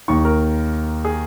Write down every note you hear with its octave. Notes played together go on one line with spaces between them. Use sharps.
D#2 D#3 C#6
A#4
G#4